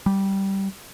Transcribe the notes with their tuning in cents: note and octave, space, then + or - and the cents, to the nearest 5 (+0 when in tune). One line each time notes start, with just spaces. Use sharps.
G3 -10